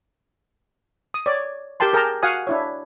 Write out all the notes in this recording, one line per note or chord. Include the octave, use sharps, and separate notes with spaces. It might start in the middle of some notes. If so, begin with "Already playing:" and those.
D#6
C#5 D5
G4 A#4 G5 A5 C6
G#4 A#4 G5 A5 A#5
F#4 F5 F#5 G#5 D#6
D4 E4 C#5